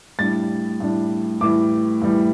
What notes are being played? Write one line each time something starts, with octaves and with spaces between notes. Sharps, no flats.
A2 G3 D4 A6
A2 G3 D4
A2 E3 G3 D6
A2 E3 G3